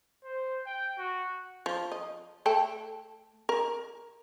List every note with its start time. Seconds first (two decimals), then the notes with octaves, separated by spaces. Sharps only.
0.24 C5
0.66 G5
0.98 F#4
1.66 F3
1.92 D#5
2.46 A3 A4 G5
3.49 A#4